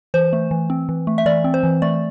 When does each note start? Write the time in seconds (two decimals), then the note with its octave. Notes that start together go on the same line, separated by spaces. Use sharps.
0.14 E3 C5
0.33 A3
0.51 E3
0.70 C4
0.89 E3
1.07 A3
1.18 E5
1.26 E3 D5
1.44 C4
1.54 C5
1.63 E3
1.82 A3 D5